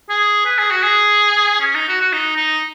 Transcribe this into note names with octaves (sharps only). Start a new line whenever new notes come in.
G#4
B4
G#4
F#4
G#4
C#4
D#4
F#4
F#4
D#4
D#4